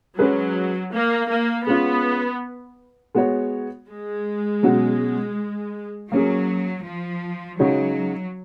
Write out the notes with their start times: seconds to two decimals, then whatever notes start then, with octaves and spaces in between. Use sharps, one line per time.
0.18 F#3 G#3 C#4 G#4 B4
0.93 A#3
1.29 A#3
1.66 G#3 B3 C#4 F4
3.15 G#3 B3 F#4 C#5
3.90 G#3
4.63 B2 F#3 C#4 F#4
6.12 F#3 A#3 C#4 G#4
6.85 F3
7.59 C#3 F#3 G#3 D#4 F#4 C#5